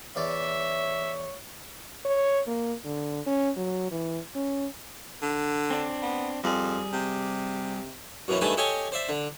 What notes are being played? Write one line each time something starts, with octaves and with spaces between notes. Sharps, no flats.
E2 E3 C#5 D5 E5
C#5
A#3
D3
C#4
F#3
E3
C#4
D3
C4 D4
B3
F2 G3 G#4
C3
F#2 B2 E3 C#4
G2 D#3 A3 B4 G#5 A5
G4 A4 C#5 D#5 G#5 C#6
C5 D5 E5
D3